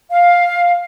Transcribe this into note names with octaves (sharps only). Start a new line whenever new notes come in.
F5